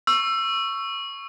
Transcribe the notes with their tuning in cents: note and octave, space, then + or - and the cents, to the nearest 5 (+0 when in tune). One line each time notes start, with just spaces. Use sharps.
C#6 +0 E6 +20